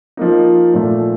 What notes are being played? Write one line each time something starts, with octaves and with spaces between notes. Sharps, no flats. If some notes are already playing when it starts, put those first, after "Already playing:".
F3 A#3 D#4
A#2 F3 A3